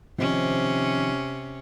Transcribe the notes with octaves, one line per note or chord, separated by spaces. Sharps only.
C3 D#3 F3 C4 C#4